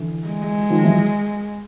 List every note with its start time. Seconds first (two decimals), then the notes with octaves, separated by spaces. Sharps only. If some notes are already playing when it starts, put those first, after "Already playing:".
Already playing: D3 E3
0.27 G#3
0.70 D#3 F3
0.84 E3 F#3